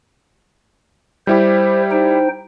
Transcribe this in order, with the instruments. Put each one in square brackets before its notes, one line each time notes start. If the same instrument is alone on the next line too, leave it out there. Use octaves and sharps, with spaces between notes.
[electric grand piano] G3 E4 G4 [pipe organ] C5
[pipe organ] D#4 C5 G5